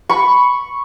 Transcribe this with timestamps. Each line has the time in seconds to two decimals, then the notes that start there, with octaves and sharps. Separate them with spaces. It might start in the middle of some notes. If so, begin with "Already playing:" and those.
0.09 B5 C#6